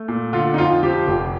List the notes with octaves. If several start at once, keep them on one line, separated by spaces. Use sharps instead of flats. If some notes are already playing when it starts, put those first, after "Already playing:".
Already playing: A3
A#2
D3 F4
D#4
F2 F4
F3 G4
F1